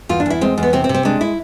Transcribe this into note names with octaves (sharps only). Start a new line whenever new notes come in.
E2 F4
D4
E2 E4
G#3 C4
E2
B3
C3 C4
C4
C3
C4
G#3 D4
E4